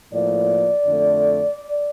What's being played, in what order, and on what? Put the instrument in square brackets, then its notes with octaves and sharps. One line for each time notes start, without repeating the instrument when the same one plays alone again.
[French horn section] A2 F3 A#3 D5
F2 D3 A3